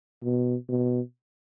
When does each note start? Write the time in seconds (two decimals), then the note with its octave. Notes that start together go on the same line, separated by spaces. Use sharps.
0.24 B2
0.69 B2